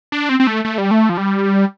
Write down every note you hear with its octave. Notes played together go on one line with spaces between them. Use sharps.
D4
C4
C4
A3
A3
G3
A3
F3
G3